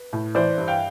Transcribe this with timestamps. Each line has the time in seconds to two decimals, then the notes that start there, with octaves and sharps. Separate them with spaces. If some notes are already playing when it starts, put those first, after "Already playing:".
Already playing: B4
0.13 A2
0.35 E3 C5 D5
0.58 G2
0.68 F5 G5